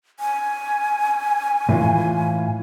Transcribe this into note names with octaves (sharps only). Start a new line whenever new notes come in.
G#5
A2 E3 F4